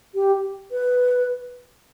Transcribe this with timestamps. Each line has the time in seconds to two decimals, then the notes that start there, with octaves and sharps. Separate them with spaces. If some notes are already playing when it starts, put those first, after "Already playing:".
0.15 G4
0.72 B4